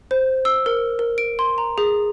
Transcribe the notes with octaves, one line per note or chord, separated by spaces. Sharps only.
C5
E6
A#4
A#4
D7
C6
A#5
G#4